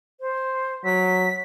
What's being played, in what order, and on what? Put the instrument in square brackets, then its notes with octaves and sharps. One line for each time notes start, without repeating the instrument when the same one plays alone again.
[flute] C5
[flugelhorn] F#3 [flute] B6